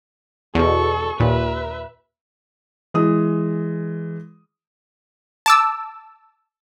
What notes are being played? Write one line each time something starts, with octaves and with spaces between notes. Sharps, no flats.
E2 B2 A4 C#6
D#2 A#2 B4 E5
E3 G#3 D#6
A5 D6 E6